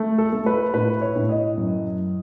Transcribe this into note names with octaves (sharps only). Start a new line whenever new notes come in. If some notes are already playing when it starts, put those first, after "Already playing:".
Already playing: A3
A4
A3
B4
A2 B4
C#5
A2
D#5
F#2